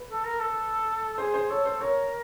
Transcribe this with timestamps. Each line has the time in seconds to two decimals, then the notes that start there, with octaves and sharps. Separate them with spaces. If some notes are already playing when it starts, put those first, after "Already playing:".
Already playing: B4
0.09 A4
0.24 A#4
0.40 A4
1.18 G#4 C5
1.34 C5
1.50 A4 C#5
1.65 C5
1.81 A#4 C#5